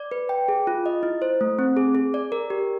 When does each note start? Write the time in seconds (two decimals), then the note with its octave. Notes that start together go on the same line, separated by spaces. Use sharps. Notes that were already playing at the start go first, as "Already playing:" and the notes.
Already playing: D5
0.11 B4
0.29 G5
0.48 G#4
0.67 F4
0.86 D#5
1.03 E4
1.22 C5
1.41 A3
1.59 C4
1.77 G#4
1.95 G#4
2.14 D5
2.32 A#4
2.50 G4